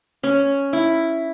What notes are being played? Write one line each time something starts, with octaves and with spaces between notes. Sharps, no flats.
C#4
E4